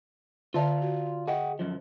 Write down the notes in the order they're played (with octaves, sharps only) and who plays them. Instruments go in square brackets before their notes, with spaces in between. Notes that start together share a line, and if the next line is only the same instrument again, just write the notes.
[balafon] D3 E5 A5 [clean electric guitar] F4 D5 F5
[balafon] F#4
[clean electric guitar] G#4 F#5 G5 [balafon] D#5 E5
[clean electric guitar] F#2 F3